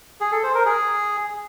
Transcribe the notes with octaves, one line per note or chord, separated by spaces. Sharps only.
G#4
A4
C5
A#4
G#4